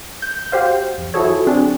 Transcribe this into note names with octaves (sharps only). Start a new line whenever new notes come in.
G6
F#4 G4 C5 F5
F2
F3 E4 F#4 G#4 A4 C#5
D3 F#3 C4 D4 G#4